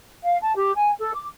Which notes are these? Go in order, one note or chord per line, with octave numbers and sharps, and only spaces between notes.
F5
A5
G4
G#5
A4
D6